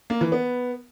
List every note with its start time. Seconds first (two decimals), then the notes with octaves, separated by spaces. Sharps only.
0.10 A#3
0.21 E3
0.32 B3